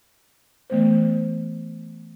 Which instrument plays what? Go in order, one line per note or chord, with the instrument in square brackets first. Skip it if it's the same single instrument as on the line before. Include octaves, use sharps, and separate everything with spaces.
[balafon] E3 A3 B3 C5